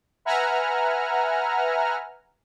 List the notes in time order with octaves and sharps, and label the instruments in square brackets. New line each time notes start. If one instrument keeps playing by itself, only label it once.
[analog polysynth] B4 E5 F#5 G#5 A#5 F6